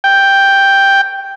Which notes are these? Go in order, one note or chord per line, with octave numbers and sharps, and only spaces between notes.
G5